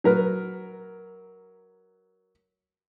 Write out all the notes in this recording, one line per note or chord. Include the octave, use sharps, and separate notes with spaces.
F#3 A#4 B4